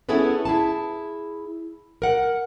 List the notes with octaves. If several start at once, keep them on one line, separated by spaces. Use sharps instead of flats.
B3 C#4 E4 G#4 A4 B4
E4 G#4 A5
A#4 F#5